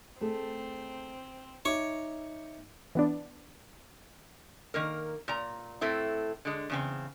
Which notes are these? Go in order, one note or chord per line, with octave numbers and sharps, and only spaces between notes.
A3 C4 G#4 A4
D#4 C#5 E5 C#6 D6
E3 B3 D4
D#3 A#3 A#4
A#2 A#5
A2 A3 C4 E4
D3 G#3
E2 C#3 C4